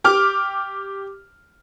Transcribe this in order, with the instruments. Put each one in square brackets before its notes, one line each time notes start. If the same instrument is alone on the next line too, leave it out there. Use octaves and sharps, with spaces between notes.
[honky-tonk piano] G4 D6 F6